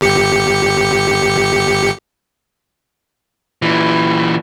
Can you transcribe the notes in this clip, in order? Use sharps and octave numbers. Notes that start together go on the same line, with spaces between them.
G1 G4 C#7
A#2 E3